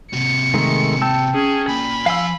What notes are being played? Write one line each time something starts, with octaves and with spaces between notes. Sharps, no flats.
C3 F#4 C#7
D#3 G#3 A3
G5 A5 E6
C#4 G#4
A#2 B5
F3 C5 F5 G#5 E6